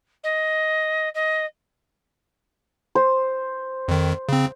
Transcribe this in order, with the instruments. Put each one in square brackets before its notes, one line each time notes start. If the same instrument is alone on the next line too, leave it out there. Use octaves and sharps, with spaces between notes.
[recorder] D#5
D#5
[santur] C5
[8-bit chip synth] F2 D#3
C#3 C4